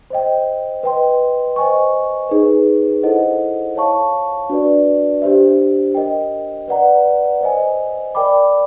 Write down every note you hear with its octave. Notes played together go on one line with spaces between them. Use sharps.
C5 D#5 G5
B4 D#5 G5 C6
C5 D#5 G#5 C#6
D#4 G#4 B4
E4 A4 C5 D#5 F#5
C#5 F5 A5 C#6
D4 F#4 B4 D5
D4 G4 C5 E5
A#4 D#5 G5
B4 D5 F#5 A#5
C5 D#5 G#5
A#4 D5 G5 B5 D6